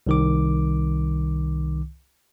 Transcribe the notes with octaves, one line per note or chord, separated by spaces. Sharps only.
C2 D#3 D6